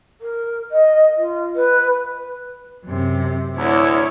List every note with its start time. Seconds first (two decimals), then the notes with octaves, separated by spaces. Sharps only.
0.21 A#4
0.71 D#5
1.17 F4
1.55 B4
2.85 F#2 C3
3.56 D2 E4 C#5